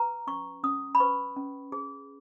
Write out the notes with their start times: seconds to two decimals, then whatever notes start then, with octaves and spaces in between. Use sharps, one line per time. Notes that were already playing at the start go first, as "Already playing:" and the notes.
Already playing: B4 A#5
0.27 C#4 C#6
0.64 C#4 D#6
0.95 B5
1.00 B4 C#6
1.36 C#4
1.72 G#4